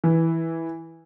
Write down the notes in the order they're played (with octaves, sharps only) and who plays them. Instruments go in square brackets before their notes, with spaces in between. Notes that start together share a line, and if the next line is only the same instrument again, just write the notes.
[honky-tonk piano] E3